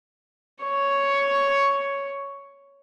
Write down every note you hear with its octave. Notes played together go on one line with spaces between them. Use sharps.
C#5 C#6